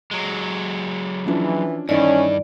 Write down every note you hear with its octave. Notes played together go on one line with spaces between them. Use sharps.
F#3 G#3
E3 F3 C#4 D4
G2 D#3 E3 C#4 D#4 D5